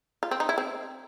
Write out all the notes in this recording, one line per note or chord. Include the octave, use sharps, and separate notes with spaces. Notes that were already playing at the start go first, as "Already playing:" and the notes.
F4
C4
D#4
E4
C4